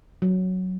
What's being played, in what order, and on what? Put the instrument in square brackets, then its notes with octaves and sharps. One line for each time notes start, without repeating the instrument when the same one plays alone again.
[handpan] F#3